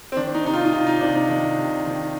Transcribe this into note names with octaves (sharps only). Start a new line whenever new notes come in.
C4
D#3 D4
D4
D#4
C3 D#4
F4
D#4
C3 F4
D#4
C3 D4
D#4
D#3 D4
C3
D#3